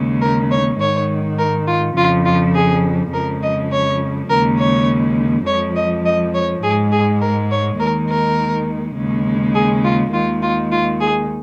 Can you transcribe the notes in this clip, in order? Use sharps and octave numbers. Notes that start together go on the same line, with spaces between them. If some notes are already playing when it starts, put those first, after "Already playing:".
Already playing: D#2 C#3 G#3
A#4
C#5
G#2 D#3 G#3 C#5
A#4
F4
F2 C#3 F3 F4
F4
G#4
F2 C#3 F3 G#3 A#4
D#5
C#5
D#2 C#3 G#3 A#4
C#5
F2 F3 G#3 C#5
D#5
D#5
C#5
G#2 G#3 G#4
G#4
A#4
C#5
D#2 D#3 G#3 A#4
A#4
D#2 C#3 G#3
G#4
F4
D#2 D#3 G#3 F4
F4
F4
G#4